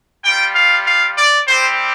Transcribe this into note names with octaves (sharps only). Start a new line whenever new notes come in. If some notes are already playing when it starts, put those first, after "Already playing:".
G3 F4 G5
F5
F5
D5
G3 C4 G4 C5